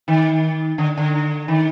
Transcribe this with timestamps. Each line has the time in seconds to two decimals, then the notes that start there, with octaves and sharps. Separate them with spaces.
0.08 D#3
0.78 D3
0.97 D3
1.48 D#3